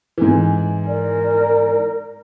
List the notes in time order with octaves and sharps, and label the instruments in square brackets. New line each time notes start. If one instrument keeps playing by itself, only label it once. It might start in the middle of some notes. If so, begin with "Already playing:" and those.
[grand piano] G#2 E3
[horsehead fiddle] A#4 [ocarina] D5